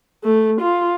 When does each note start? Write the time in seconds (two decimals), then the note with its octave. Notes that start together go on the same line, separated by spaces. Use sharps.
0.24 A3
0.61 F4